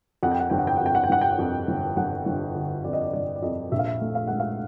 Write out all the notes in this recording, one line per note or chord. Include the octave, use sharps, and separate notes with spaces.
F2 F#5
G5
F#5
G1 G5
F#5
G5
F#5
F2 G5
F#5
G5
G1 F#5
G5
F#5
F2
G1
G1 F#5
G1
D3
F2 D5
D#5
D5
G1 D5
D5
F2 D#5
A#1 E5
F5
E5
A3
F5
G#2 F#5
F5